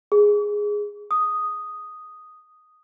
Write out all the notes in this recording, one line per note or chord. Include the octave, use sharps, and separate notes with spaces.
G#4
D#6